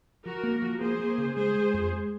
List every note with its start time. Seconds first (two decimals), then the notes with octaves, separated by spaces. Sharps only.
0.25 F3 F#4 A#4
0.43 A#3
0.62 F3
0.81 A#3 G#4 C5
1.00 A#3
1.18 C#3
1.37 G#3 G#4 C5
1.55 G#3
1.73 F2
1.93 G#3